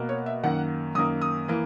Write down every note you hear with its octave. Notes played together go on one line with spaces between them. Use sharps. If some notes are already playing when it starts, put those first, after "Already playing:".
Already playing: B2 A#3
C#5
E5
F#2 D#3 A#3 F#5
F#2 D#3 A#3 D#6
D#6
E3 A#3